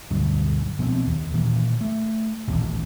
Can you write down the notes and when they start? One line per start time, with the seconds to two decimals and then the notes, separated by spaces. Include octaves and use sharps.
0.10 D2 G2 B2 F#3
0.79 B2 F3 B3 C4
1.06 D#2
1.34 A#2 D#3 E3
1.81 A3
2.47 A1 D#2 A#2